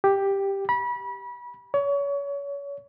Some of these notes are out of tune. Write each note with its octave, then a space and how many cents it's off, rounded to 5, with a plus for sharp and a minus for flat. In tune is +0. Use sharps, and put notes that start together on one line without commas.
G4 +5
B5 -30
C#5 +30